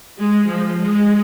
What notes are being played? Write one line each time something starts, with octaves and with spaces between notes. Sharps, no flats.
G#3
F3
G#3